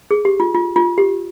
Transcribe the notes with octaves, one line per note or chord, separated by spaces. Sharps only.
G#4
G4
F4
F4
F4
G4